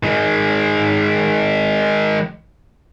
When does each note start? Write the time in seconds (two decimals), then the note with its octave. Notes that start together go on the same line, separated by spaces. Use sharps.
0.03 D#3 G#3